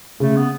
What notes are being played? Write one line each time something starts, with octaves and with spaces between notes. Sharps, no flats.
C#3 A3
B3